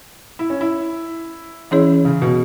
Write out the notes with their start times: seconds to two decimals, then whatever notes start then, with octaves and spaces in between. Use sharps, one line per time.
0.39 E4
0.50 C#4
0.61 E4
1.71 E3 C#4 E4 G#4 C#5
2.05 C#3
2.22 B2